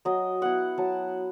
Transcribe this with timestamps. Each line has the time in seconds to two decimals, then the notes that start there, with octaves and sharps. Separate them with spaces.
0.05 F#3 D#5
0.42 B3 E4 F#5
0.78 F#3 A5